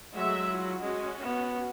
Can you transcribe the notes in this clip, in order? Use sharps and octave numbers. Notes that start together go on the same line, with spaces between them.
F#3 G#3 A3 E5
E4 F4
G#3 C#4 F#4
B3